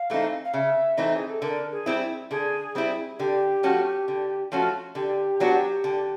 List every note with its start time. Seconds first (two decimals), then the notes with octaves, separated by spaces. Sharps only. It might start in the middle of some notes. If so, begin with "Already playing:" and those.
Already playing: F5
0.10 E3 A3 C4 D#4
0.45 F5
0.54 C#3 E5
0.97 E3 A3 C4 D#4
1.16 G#4
1.30 A4
1.42 D3 A#4
1.72 G#4
1.86 G3 C4 E4
2.31 D3 G#4
2.75 G3 C4 E4
3.19 D3 G4
3.63 F3 A3 C#4 F#4
4.08 D3
4.52 F3 A3 C#4 F#4
4.95 D3 G4
5.40 F#3 B3 D4 F#4
5.84 D3